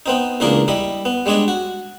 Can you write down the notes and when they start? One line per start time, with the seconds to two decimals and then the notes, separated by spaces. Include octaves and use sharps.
0.06 B3 C4 D#4
0.40 C#2 E3 A#3 D4 G#4 A#4
0.68 G3 E4 D#5
1.05 B3
1.26 G3 G#3 D4 C#5 D#5
1.48 F#4